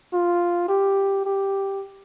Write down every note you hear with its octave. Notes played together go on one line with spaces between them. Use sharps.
F4
G4
G4